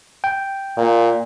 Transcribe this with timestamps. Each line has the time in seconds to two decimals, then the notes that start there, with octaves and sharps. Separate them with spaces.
0.24 G5
0.77 A#2